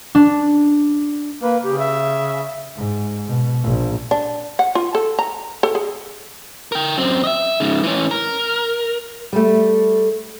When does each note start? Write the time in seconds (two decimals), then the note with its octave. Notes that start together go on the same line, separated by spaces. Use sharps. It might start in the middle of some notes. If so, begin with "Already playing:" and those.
0.15 D4
1.42 A#3 B4
1.64 C#3 G4
1.79 E5
2.77 G#2
3.28 B2
3.64 A#1
4.11 D4
4.59 F#5
4.75 F4
4.95 A4
5.19 A#5
5.63 A4
5.75 G#4
6.72 A#4 G5
6.97 F#2 C4
7.24 D#5 E5
7.60 G#2 C#3
7.83 E3 C#4
8.11 A#4
9.33 G3 A3